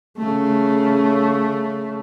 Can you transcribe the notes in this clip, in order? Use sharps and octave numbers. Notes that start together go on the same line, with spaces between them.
C#3 A3